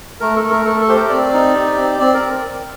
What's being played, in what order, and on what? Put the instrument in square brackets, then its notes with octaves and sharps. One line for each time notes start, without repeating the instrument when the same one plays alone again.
[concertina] A3 A#4
A4
A3
A#4
A3 A4
A4
G4 C5
A#4
C4 D5
D#4
G4
C4
C4 D5
A#4